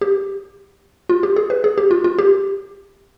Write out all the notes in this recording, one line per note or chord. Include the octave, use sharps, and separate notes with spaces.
G4
F4
G4
G#4
B4
G#4
G4
F4
F4
G4